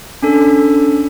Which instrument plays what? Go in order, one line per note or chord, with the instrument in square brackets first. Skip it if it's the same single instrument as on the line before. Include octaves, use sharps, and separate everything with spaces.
[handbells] C#4 D4 A4